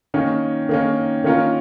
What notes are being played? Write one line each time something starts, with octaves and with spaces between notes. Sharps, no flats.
D#3 A#3 C#4
D#3 A#3 C#4
D#3 A#3 C#4 F4 A#4